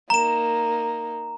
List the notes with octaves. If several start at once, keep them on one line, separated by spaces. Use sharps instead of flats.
A#3 D#4 A#5 E7